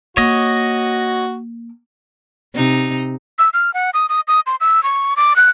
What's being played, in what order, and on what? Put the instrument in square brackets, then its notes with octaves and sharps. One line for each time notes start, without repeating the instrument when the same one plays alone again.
[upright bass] A#3 [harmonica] F#4 [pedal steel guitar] C#5 D#5
[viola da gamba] C3 D#4
[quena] E6
F6
F#5
D#6
D#6
D#6
C6
E6
C#6
D6
F#6